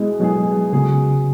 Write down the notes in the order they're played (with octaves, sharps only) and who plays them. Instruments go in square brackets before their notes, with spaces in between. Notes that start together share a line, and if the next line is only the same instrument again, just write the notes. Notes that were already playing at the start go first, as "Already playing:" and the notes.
Already playing: [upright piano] B2 B3 E4 G#4 [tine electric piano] G#3
[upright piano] B2 B3 E4 G#4 [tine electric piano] F#3
[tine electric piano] C#3 [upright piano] F#3 B3 G#4